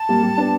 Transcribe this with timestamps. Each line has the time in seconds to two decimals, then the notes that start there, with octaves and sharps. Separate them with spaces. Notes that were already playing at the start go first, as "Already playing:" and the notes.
Already playing: A5
0.09 G3 A#3
0.23 G3
0.38 B3 D4